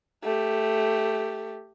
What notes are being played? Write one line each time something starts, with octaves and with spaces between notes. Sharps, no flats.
A3 G4